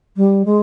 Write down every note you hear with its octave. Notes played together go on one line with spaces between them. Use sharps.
G3
G#3